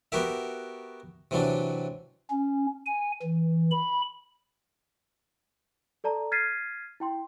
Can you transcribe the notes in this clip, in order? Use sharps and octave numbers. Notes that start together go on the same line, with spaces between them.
B3 F#4 G4 A#4 E5
C3 E3 F#3 D4
C#4
G#5
E3
B5
A4 D5 A5 A#5
F6 G#6 A6 B6 C7 D#7
E4 G5 C6